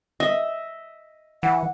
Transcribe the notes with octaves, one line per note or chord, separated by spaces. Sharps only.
D#5 E5
E3 F#5